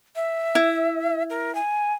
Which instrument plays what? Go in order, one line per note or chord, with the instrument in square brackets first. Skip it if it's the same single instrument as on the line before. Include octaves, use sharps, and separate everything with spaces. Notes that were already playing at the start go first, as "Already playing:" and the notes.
[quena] E5
[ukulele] E4
[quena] A#4
G#5